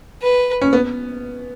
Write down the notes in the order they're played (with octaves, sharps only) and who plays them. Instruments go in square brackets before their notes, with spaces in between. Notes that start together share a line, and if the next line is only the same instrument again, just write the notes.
[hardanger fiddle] B4
[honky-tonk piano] C#4
B3